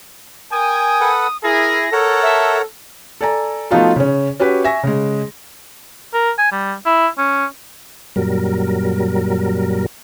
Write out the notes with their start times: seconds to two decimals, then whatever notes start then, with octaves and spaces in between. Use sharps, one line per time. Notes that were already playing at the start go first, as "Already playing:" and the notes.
0.52 A#4 G5 G#5 D#6
1.01 A4 B4 F#5
1.44 E4 G#4 A#4 A#6
1.92 A4 A#4 C#5 F#5
2.23 E5
3.21 A4 D5 G#5 A#5
3.71 F3 A3 B3 D#4 F4 F#4
3.96 C#3 C#4
4.40 C#4 F#4 G4 B4
4.64 E5 G#5 C#6 A#6
4.83 C#3 G#3
6.14 A#4
6.39 G#5
6.52 G3
6.86 E4
7.18 C#4
8.16 F#2 A#2 F#3 G3 A#4